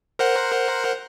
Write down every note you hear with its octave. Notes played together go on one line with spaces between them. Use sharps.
A#4 C5 F#5